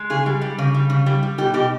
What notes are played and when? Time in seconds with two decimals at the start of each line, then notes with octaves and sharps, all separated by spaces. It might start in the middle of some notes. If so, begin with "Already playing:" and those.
Already playing: G#3
0.10 C#3 G#4
0.26 G3
0.41 G3
0.59 C#3
0.74 G3
0.90 C#3
1.06 G3
1.23 G3
1.38 B2 G4
1.54 B2 G4